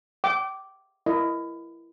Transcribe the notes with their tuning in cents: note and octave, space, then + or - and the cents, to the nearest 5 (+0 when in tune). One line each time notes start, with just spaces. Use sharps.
G5 -30 D6 -5
E4 +20 A#4 +0 D#5 +0